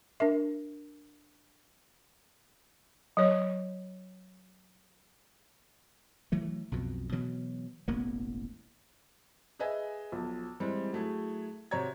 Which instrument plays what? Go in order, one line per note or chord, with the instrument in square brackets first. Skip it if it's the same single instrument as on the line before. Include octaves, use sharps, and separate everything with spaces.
[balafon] D4 A#4 E5
F#3 C#5
[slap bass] E3 F#3 A3
B1 F2 B2
B2 E3 F#3
E1 A1 A#3 B3
[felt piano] G#4 B4 D#5 E5 G#5
B1 F3
E3 G3 G#3 C4
F#3 A3 E4 G#4
C3 F#4 C#5 A#5 G#6